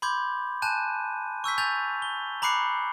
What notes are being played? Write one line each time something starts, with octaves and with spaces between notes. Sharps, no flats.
B5 C6 D6 G6 G#6
G#5 A5 F#6 G6 D#7
C#6 E6 G6 B6
G#5 G6 A6 F7
G7
A#5 B5 D6 F#6 C7 C#7